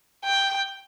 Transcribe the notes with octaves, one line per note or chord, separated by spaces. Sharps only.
G5